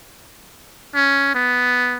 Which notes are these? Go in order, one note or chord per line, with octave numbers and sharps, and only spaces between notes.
C#4
B3